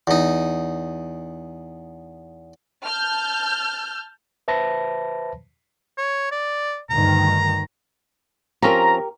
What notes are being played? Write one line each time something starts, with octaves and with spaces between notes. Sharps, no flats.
E2 D#4
A5 F6 G6
B4 C5 E5 A5 B5 A#6
C#5
D5
D2 G2 D#3 A#5
F3 C4 C#4 G4 A#4 A#5